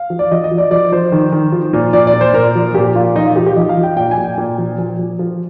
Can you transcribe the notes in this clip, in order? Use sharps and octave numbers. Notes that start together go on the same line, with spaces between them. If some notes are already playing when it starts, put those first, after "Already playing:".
Already playing: F5
F3
D5
F3 D#5
D#5
F3
D5
F3 D5
F3 C5
D#3
D#3
F3
A#2
A#2 D5
D5
A#2
C5
A#2 A#4
F3
A#2 G4
A#2 F4
F3 D#4
F4
F3 G4
G4
F3 D#5
F5
F3
G5
A#2 G5
G#5
A#2
G5
A#2
F3
F3
F3
F3